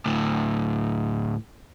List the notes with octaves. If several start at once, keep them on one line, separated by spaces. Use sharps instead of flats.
D2 A2